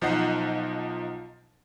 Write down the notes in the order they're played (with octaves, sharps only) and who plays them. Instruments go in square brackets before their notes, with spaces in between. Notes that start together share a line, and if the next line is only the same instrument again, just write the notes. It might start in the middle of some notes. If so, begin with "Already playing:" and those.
[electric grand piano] B1 F3 D#4 D#5 F#5 C7